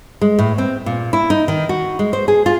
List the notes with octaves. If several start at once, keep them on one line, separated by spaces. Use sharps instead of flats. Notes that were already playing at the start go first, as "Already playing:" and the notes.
G#3
A2
C4
A#2
E4
D#4
D#3
F#4
G#3
C5
G#4
F4